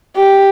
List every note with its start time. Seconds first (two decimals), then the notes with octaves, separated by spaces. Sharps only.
0.16 G4